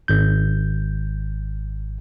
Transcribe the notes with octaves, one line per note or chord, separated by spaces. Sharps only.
G#1 G6